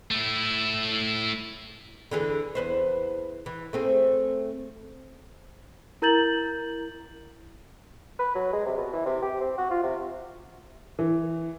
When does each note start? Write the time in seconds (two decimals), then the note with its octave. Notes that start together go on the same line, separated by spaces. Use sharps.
0.11 A3 E4
2.11 D3 E3 G#4
2.55 E2 B4 C5
3.46 E3
3.73 A3 C4 G#4
6.02 E4 A#4 A#5 G6 A6 F#7
8.19 B4
8.35 F#3
8.53 G#3
8.66 C3
8.77 B2
8.93 E3
9.06 C3
9.22 G4
9.41 C4
9.58 F#4
9.70 F4
9.83 C3
10.99 E3